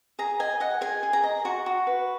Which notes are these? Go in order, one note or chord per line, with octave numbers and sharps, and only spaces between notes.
G#4 A#5
D#5 G#5
D#5 F#5
G#4 G#5
G#4
A#5
D#5
F#4 C#6
F#4
B4